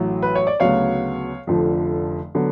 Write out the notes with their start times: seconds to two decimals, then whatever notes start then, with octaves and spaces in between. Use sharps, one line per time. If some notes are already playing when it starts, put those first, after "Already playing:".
Already playing: A1 A2 F#3
0.22 B4
0.35 C#5
0.47 D5
0.60 D2 C#3 F#3 B3 C#5 F5
1.47 F1 F2 D3 F3
2.35 D3 F#3 B3